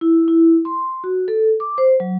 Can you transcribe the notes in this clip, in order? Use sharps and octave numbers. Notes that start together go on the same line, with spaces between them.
E4
E4
C6
F#4
A4
D6
C5
F#3